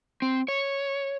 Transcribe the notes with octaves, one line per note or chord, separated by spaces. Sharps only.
C4
C#5